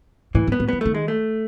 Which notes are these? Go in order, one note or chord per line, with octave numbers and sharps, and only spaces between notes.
A2 E3
G#2
B3
A2
E3 B3
D#3 A3
G#3
A3